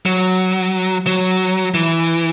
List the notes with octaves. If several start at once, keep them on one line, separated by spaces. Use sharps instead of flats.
F#3
F#3
E3